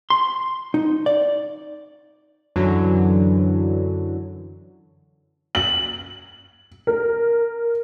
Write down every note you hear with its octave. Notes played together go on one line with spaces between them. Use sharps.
C6
D#4
D5
F#2 D3 E3 F#3
F#7
A#4